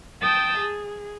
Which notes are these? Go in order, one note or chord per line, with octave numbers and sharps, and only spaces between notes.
G5 A5 D#6 E6 G6
G#4